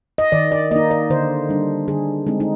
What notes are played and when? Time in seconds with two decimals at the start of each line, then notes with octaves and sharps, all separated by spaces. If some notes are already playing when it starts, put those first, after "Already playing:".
0.18 D#5
0.32 D#3 D5
0.52 D5
0.71 A#3 D#5
0.76 D#4
0.91 D5
1.10 D3 C5
1.49 G3 D4
1.88 D3 G#4
2.27 G#3 C4 D#4
2.40 D#4